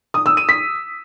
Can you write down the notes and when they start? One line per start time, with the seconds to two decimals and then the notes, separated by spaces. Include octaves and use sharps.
0.14 D#6
0.26 E6
0.37 D#7
0.49 B6